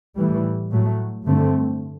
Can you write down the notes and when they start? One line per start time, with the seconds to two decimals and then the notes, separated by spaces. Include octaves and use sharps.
0.16 A2 E3 G3
0.71 A2 F#3 A3
1.24 G2 D3 A3 C4